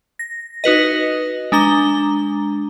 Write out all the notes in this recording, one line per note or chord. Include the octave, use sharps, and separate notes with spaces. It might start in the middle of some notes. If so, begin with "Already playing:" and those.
A#6
D#4 F#4 B4 D#5
G#3 D4 A#5 G7